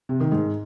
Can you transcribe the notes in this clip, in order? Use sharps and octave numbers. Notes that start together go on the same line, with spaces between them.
C3
D#3
G#2